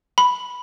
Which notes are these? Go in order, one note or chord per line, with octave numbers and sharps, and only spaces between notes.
B5